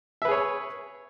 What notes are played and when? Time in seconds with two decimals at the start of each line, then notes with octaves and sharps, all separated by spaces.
0.22 E5
0.25 B4
0.28 G#4
0.31 C#5